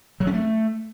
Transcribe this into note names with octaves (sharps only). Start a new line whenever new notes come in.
F#3
C#4
A3